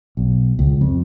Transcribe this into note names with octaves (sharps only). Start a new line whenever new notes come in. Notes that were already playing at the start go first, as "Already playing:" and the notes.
B1
C#2
F2